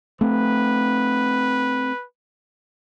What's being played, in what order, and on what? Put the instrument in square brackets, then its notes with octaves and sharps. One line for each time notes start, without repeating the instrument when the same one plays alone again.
[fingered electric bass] A3 C4 [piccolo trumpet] B4